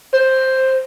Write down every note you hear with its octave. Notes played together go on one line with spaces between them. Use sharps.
C5